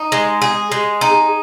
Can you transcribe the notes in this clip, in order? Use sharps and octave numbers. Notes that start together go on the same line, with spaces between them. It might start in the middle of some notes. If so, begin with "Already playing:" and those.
Already playing: D#4
G#3
G#4
G#3
D#4